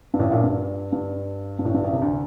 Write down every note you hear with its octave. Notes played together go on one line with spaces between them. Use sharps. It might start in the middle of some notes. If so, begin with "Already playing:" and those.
G2
A1 A2
A#1 A#2
G2
G2
G2
A1 A2
G2
A1 A2
C2 C3
D2 D3